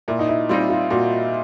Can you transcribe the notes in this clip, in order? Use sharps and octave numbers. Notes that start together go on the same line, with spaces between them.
A#2 E4
D#4
E4
G3 C4 D#4 F4
F4
A#2 F#4